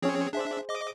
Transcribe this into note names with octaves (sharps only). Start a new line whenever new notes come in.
F3 C4 C#4 G#4 C#5
D4 G#4 C5 E5
D#5 D6